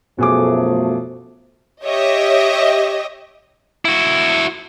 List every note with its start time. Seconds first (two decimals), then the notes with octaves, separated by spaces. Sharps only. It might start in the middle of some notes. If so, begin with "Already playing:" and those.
0.19 F#2 B2 F3 A3 G#4 D6
1.83 G4 C#5 D#5 E5
3.85 E4 F#4